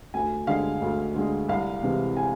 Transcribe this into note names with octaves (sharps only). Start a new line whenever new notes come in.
D2 G#5
D3 G#3 F5
D2
D3 G#3
C2 F5
C3 E3 G#3
G#5